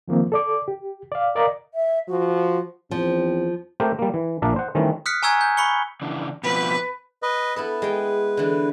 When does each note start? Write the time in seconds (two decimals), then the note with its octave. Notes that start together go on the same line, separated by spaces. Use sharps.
0.08 D#3 F3 A#3 C4
0.32 A4 D5 D6
0.68 G4
1.12 D5 F5
1.35 A#4 D5 D#5 F5 A#5
1.74 E5
2.08 F3 F#4
2.91 E2 F3 C4
3.80 A3 C4 G4 A#4 C5 G5
3.99 G3 A#3
4.14 E3
4.42 A#1 A#2 D4 A#4 E5
4.56 C5 F#5
4.75 D#3 E3 G3 A3 C4 C#4
5.06 D#6 F6 F#6 B6 C#7
5.23 G#5 A#5 C#6 E6 F#6 G#6
5.41 G6
5.57 B5 C#6 C#7 G7
6.02 C#3 E3 D4
6.43 B2 F3 C4 B4
7.23 B4 D#5
7.56 B3 E4 A4 B4
7.82 G#3 G5
8.37 D3 E3